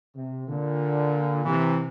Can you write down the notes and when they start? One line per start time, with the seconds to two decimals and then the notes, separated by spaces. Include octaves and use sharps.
0.16 C3
0.48 A#2 D3
1.44 C3 E3